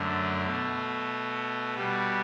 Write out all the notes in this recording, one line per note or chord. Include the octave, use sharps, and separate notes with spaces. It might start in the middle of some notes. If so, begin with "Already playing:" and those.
Already playing: F#2 D3 A3
B2 A3
B2 G3 B3